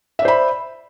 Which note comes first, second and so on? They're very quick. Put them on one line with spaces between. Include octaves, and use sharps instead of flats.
E5 D5 C5 B5